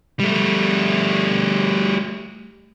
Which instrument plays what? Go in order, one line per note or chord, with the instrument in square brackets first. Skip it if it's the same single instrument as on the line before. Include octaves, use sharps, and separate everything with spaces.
[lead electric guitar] G3 A3